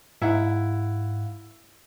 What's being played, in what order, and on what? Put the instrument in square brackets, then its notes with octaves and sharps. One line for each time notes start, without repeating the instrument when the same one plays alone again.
[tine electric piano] G#2 F5 F#5 [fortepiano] E4